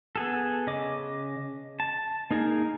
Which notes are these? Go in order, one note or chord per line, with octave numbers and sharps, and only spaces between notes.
B3 G#4 A4
C#3 D#5 D6
A5
A#3 D#4 G#4 A#4